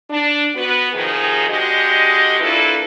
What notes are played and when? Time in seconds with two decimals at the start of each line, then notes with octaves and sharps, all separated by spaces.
0.10 D4
0.55 B3 F#4 B4
0.93 C3 D#3 F3 D#4 G#4
1.49 D3 G#3 F#4 G4 D#5
2.40 A#3 D4 E4 F4 A4 B4